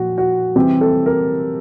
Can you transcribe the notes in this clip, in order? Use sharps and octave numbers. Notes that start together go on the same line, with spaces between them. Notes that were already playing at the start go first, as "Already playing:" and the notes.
Already playing: A#2 F3 F#4
F#4
C3 E3 G3 C4 G4
A4
A#4